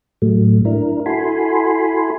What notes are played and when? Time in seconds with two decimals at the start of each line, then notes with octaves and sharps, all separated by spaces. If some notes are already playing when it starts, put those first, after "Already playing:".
0.22 A2 F#3 A3
0.65 D4 E4 A#4
1.06 E4 F#4 A4 G#5 B5 C6